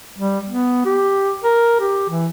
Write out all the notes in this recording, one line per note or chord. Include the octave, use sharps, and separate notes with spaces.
G3
B3
G4
A#4
G4
E3